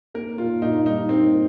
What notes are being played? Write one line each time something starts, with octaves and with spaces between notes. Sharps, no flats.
A#3 A#4
A#2 F4
A#2 D#4
G3 D#4
A#3 C4
A#2